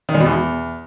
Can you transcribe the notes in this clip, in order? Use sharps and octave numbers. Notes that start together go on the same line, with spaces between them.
D#3
G#3
B2
E2